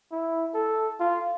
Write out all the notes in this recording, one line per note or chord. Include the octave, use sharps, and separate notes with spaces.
E4
A4
F4